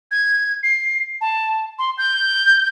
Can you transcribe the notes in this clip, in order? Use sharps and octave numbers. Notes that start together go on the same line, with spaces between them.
G#6
C7
A5
C6
G6